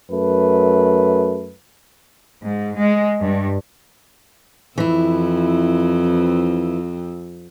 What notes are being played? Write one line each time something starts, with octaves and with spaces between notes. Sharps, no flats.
F#2 A3 B4
G#2
G#3
G2
F2 E3 C4 E4